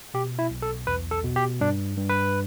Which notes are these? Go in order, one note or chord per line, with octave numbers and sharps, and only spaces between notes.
B2 G4
E4
B1
A4
E2 B4
A4
B2
G4
G2 D4
G2
B4